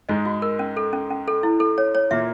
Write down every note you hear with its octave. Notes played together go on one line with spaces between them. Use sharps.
G#2 G#3 D#5
F#4
A#4
C#4
A4
C#4
C#4
A4
E4
A4
C#5
C#5
A#2 A#3 E5